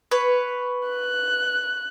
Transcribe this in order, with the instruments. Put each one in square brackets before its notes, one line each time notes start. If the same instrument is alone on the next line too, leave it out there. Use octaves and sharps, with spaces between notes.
[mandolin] B4 C#5
[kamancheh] F#6